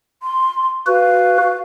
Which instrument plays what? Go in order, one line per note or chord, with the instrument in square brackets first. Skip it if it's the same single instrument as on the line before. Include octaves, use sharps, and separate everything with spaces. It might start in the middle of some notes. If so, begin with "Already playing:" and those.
[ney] C6
[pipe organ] F#4 B4 [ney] F5